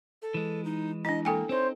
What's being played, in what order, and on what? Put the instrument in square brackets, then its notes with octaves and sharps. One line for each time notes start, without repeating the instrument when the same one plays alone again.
[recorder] A4
[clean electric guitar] E3 G#3
[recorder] D#4
[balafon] D4 E4 [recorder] D#5
[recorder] A#3 [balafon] A4 G5 G#5
[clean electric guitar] C4 D#4 [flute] C5 [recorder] C#5